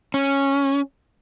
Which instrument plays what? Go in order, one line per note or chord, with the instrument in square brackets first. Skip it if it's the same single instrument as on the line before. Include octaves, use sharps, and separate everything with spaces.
[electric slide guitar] C#4